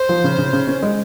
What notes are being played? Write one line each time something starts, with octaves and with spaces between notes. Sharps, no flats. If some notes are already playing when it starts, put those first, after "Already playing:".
Already playing: C5
F3
C#3
C#3
C#3
C#4
G#3